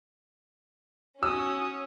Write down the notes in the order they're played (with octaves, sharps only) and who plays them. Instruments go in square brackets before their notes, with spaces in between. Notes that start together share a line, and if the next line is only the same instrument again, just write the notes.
[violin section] C#4 [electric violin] F#4 D#6 [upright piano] E6